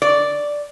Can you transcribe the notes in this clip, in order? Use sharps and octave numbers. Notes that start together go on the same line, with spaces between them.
D5